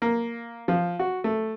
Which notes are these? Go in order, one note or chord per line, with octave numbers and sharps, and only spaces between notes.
A#3
F3
F#4
A3